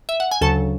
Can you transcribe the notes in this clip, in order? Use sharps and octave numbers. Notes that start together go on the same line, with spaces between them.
E5
F#5
G#5
D2 C#3 F#3 A4 A5